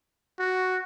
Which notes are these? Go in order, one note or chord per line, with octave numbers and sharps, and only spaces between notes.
F#4